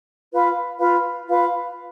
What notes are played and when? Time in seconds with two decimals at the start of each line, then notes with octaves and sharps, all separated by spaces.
0.32 F4 B4 F5 B5
0.79 F4 B4 F5 B5
1.29 F4 B4 F5 B5